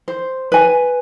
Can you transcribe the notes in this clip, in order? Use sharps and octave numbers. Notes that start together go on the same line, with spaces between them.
C5
B4 G#5